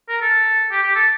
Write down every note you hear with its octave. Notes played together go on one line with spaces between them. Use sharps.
A#4
A4
G4
G4
A4